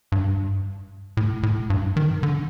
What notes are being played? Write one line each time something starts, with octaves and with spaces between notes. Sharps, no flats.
G2
A2
A2
G2
D#3
D3